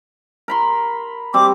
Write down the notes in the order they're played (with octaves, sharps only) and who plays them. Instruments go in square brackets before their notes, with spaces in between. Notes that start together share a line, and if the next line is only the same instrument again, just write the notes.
[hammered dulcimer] A#4 B5 C6
[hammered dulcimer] G3 C4 [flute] D6